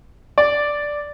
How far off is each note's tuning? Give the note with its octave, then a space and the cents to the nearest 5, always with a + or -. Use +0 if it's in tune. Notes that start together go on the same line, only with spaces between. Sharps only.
D5 +0